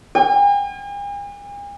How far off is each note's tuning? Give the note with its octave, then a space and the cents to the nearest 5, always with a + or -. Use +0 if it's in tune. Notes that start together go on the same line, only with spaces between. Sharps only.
G#5 -45